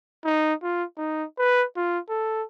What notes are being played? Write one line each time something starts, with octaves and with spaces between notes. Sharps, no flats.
D#4
F4
D#4
B4
F4
A4